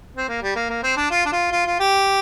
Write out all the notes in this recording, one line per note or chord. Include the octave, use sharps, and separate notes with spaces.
C4
A#3
G3
A#3
A#3
C4
D4
F4
D4
F4
F4
F4
G4